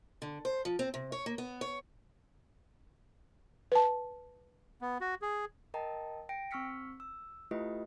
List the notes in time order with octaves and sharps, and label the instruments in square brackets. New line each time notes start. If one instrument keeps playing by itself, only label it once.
[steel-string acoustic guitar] D3
C5
F3
C4
C3
C#5
A#3
B3
C#5
[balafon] B4 A5
[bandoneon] B3
F#4
G#4
[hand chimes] A#4 D#5 G5 A5 A#5
G5 A#6 D7
C4 C#6 E6 F6 B6 C#7
E6
A3 E4 F4 G4 B4 D#5